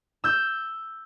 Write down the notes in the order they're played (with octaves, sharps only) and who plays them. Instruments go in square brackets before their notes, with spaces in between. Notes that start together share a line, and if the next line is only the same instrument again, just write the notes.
[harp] E6 G6